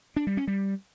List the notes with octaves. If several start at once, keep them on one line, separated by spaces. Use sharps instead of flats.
D4
G3
C#4
G3